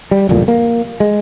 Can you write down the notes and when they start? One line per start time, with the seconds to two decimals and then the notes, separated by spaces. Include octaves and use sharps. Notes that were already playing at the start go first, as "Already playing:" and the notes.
0.11 G3
0.29 D1 C2 F2 A#2
0.48 A#3
1.00 G#3